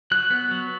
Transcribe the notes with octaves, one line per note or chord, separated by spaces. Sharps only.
F#3 F#6
B3
F#3